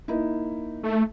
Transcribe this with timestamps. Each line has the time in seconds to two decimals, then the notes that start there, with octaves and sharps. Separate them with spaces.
0.08 A#3 D#4 E4
0.83 A3